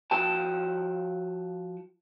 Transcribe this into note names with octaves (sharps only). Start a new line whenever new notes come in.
F3 F#4 G5 A5